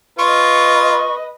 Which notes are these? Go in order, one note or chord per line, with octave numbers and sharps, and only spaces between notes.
F4 B4 D#5 C#6